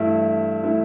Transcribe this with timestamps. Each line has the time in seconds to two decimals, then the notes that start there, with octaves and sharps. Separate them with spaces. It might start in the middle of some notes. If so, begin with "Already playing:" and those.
Already playing: G2 E3 A3 E4 E5
0.63 E3 A3 E4